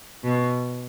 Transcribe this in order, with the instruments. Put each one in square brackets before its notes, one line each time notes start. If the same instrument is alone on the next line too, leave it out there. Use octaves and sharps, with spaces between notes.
[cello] B2